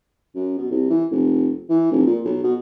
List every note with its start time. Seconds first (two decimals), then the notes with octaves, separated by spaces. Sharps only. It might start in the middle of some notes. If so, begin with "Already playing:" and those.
0.35 F#2
0.58 B2
0.71 C2
0.90 E3
1.11 F1
1.70 E3
1.91 F1
2.06 A#2
2.25 B1
2.44 B2